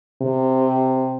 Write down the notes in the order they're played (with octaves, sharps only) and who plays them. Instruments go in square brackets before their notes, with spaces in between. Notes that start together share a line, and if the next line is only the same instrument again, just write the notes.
[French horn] C3